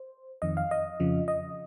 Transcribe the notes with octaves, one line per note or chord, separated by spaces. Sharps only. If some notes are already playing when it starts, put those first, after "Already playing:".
Already playing: C5
F2 D#3 D#5
F5
D#5
F2 C#3 F3
D#5